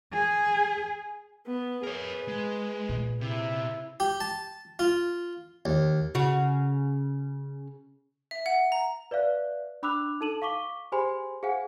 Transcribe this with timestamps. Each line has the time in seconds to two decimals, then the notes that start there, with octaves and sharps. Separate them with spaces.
0.13 G#4
1.46 B3
1.83 G#4 A#4 B4 C#5
2.28 G#3
2.89 A#2
3.21 C3 E4
4.00 G4
4.20 A5
4.79 F4
5.65 D#2
6.15 C#3 F#4
8.31 E5
8.46 F#5
8.72 A#5
9.11 B4 D5 E5 F5 F#6
9.83 D4 B5 D6 E6 F#6 F7
10.21 D#4 A4 A5 D#7 E7 F#7
10.42 F5 C#6 D6 B6 G7
10.92 G4 G#4 C5 G#5 B5 C6
11.43 G#4 C5 F5 F#5 G#5